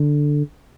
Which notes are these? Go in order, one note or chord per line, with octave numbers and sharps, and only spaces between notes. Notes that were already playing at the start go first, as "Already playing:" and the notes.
Already playing: D3